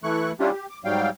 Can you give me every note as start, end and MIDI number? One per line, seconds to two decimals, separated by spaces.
0.03 0.32 52
0.03 0.32 57
0.03 0.32 64
0.03 0.32 85
0.03 0.32 90
0.40 0.51 55
0.40 0.51 61
0.40 0.51 62
0.40 0.51 64
0.40 0.51 65
0.40 0.51 67
0.51 0.66 67
0.70 0.79 86
0.85 1.10 44
0.85 1.10 54
0.85 1.10 55
0.85 1.10 77
0.85 1.10 79